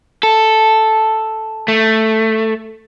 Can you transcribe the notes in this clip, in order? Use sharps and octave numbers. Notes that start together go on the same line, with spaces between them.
A4
A3